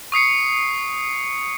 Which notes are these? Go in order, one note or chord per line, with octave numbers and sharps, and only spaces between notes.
C#6 D#6 C7 C#7